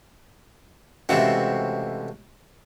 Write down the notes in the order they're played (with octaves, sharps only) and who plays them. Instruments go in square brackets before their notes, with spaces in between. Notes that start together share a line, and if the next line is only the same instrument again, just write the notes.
[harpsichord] C#2 C3 E3 [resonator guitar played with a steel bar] A3 C4 F#4